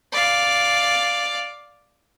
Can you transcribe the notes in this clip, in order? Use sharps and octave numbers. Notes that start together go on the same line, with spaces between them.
D5 F5